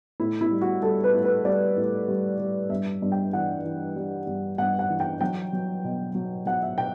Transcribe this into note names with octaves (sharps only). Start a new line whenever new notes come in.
A2 E4
E4
G3
F#4
G3 A4
B4
A2
B4
G3 D5
A2
G3
G3
G2 E5
G2
G5
E3 F#5
E3
G3
G2
G2 F#5
F#5
E3
G5
F#3 G5
F#3
B2
F#3
F#3 F#5
E5
B2 G5